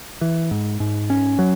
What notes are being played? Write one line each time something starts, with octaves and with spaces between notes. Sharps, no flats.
E3
G#2
G#2
C#4
F#3